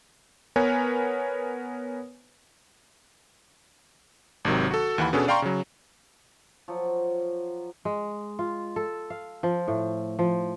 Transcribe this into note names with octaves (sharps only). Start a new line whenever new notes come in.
B3 A#4 B4 C#5 G#5
G#1 C3 D#3 F#3
F#4 A4
D#2 E3 F#5 B5
B2 B3 C#4 D4 G#4 A4
D5 F5 G5 A#5 C6 C#6
C#3 F#3
F3 F#3
G#3
F4
A4
F5
F3
A2
F3